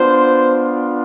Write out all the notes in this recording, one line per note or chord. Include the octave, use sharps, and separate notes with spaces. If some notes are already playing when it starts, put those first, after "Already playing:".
Already playing: B3 D4 F4 C5